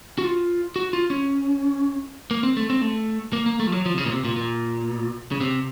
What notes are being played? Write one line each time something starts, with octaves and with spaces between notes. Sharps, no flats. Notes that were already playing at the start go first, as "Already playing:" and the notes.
F#4
F4
F#4
F4
C#4
A#3
C4
A3
C4
A3
A#3
A#3
A3
F3
F#3
F3
C3
C#3
A#2
C3
A#2
A#2
C#3
C3